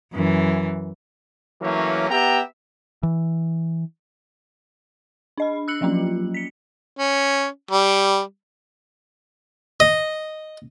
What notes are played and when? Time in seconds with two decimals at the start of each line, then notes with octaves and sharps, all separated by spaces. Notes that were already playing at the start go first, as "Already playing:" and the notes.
0.14 F#2 E3
1.61 E3 F#3 A3 A#3 C#4
2.10 B3 G4 E5 G5 A#5
3.03 E3
5.38 D4 D#5 B5
5.68 E6 F#6 C#7 F#7
5.81 F3 F#3 A#3 C#4 F4
6.34 B6 C#7
6.97 C#4
7.71 G3
9.80 D#5